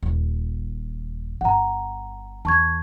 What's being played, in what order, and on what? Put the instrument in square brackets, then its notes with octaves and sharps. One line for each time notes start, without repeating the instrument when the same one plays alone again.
[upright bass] D#1
[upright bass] G1 [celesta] F#5 A#5
[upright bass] E2 [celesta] A5 C#6 G#6